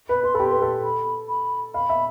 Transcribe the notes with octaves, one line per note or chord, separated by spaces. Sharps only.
B4 B5
B4 C6
G4 A4 B5
C6
B4
A4
B5
B5
F5 B5
E5